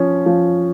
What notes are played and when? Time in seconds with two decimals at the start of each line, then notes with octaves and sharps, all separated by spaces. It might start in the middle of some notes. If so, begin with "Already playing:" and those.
Already playing: F3 C#4
0.26 F3